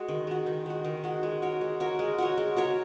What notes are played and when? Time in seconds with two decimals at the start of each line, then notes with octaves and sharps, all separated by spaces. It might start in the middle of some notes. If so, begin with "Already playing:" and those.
Already playing: G#3 F#4
0.08 D#3
0.27 G#3 F#4
0.46 D#3
0.66 G#3 F#4
0.85 D#3
1.04 G#3 F#4
1.23 G#3
1.42 F#4 A#4 C#5
1.61 G#3
1.80 F#4 A#4 C#5
1.99 G#3
2.18 F#4 A#4 C#5
2.37 G#3
2.56 F#4 A#4 C#5